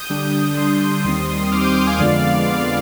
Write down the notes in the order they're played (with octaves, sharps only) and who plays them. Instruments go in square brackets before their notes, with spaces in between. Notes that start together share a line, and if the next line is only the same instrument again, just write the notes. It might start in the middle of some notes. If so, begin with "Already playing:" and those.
Already playing: [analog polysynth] D#6 G6
D3 G3 D4
D3 G3 D4 C6 D#6
D#2 D#3 G3 C4
D#2 D#3 G3 C4 D6 F6
D#6 G6
D6 F6
F5 G#5
F2 D3 G#3 B3 F4 D5 F5
F2 D3 G#3 B3 F4